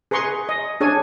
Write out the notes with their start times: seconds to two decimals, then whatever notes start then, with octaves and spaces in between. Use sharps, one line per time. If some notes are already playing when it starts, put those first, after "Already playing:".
0.11 G#4 B4 A#5 C6 C#6
0.49 D#5
0.81 D4 G#4 C#5 G#5